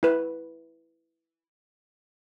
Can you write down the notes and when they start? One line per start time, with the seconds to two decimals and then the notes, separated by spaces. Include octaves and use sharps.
0.03 E4 B4